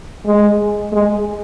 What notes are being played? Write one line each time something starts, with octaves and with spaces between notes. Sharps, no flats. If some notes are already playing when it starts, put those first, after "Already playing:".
G#3
G#3